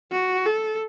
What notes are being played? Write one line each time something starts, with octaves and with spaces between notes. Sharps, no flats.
F#4
A4